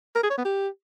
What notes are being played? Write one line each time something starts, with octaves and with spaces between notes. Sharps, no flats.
A#4
G#4
C#5
B3
G4